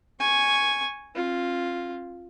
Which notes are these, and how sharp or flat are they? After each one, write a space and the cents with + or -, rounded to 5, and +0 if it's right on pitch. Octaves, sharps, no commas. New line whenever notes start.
G#5 +0 C#6 +0
C4 +45 F4 +0